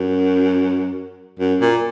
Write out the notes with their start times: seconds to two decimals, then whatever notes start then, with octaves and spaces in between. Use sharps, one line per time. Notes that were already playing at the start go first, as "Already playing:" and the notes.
Already playing: F#2
1.39 F#2
1.61 A#2